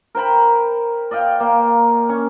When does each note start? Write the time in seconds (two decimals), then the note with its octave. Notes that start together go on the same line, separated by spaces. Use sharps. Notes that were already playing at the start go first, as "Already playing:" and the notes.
0.15 A#4 C5 G5 B5
1.11 D5 D#5 F5 G5
1.40 A#3
2.09 C#4 C#6